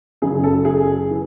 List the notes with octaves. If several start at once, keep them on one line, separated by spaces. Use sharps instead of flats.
F#1 F#2 C#3 G#4
A4
G#4
E3